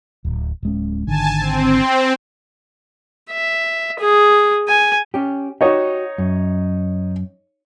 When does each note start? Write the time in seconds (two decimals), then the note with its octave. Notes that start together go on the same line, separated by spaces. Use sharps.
0.25 D1
0.63 D1 G#3 C#4
1.07 G#1 D3 D#3 G#5 A5
1.40 C4
3.31 E5
3.99 G#4
4.69 G#5
5.14 C#4 G4
5.61 D#4 F#4 G4 C#5 D#5
6.18 F#2